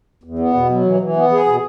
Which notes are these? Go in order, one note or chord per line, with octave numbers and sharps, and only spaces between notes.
E2
B3
B2
F#3
E3
E3
B3
G#4
B2